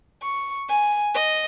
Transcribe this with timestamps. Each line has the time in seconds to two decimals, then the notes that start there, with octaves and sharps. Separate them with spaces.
0.22 C#6
0.69 G#5
1.15 D#5